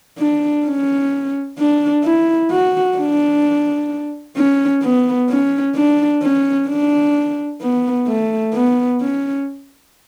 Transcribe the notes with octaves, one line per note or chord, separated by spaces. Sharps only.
D4
C#4
D4
E4
F#4
D4
C#4
B3
C#4
D4
C#4
D4
B3
A3
B3
C#4